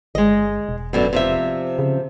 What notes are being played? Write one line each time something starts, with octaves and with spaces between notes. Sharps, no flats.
G1 G#3 D#5
E1
F#2 B2 D3
C3 F3 E5
C#3